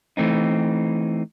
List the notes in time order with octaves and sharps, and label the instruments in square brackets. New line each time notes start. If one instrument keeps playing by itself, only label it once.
[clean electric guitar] E3 A3 C4 D#4